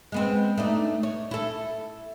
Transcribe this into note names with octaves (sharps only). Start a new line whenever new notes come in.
G#3 B3 C4
A3 D4 D#4
C#5
E4 A4